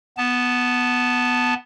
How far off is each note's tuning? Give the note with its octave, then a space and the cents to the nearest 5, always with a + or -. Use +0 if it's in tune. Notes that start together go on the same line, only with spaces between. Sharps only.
B3 +0 A5 +0